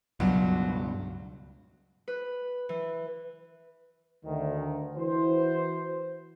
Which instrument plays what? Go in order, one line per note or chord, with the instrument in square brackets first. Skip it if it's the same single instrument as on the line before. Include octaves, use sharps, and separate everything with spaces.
[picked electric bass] C#2 G2 B2 [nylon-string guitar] F#3
[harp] B4
E3
[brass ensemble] D2 D#3
E3 E4 F#4 B4 C5